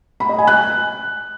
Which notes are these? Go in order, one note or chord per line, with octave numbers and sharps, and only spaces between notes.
B5
D#5
G#5
F#6